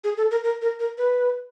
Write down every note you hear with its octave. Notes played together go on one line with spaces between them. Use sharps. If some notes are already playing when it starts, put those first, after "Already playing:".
G#4
A4
A#4
A#4
A#4
A#4
B4